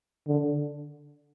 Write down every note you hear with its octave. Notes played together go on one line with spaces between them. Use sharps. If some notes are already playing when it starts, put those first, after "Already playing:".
D3